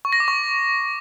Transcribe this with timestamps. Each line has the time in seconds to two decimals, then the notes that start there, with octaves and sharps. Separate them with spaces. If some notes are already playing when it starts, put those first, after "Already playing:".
0.05 C#6
0.12 A#6
0.20 D6
0.28 C#6